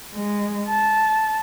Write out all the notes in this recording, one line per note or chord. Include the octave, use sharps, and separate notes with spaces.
G#3
A5